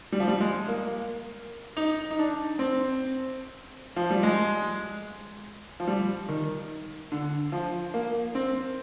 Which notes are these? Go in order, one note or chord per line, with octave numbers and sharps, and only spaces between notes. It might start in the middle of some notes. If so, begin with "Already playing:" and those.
G3
F3
G3
G#3
A#3
D#4
D#4
D4
C4
F3
G3
G#3
F3
G3
D#3
D3
F3
A#3
C4